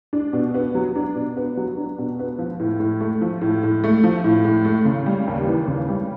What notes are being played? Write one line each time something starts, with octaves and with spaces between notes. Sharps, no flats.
D4
B2
B3
F#3
D4
B2
B3
F#3
D4
B2
B3
F3
A2
A2
A3
F3
A2
A2
A3
F3
A2
A2
A3
C#3
G3
D#2
E3
C#3
G3